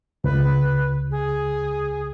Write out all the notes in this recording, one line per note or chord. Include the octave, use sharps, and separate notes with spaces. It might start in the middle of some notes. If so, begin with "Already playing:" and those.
C#2 B4
G#4